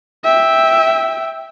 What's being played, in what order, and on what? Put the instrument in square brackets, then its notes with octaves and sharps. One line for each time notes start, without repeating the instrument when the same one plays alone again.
[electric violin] E5 G5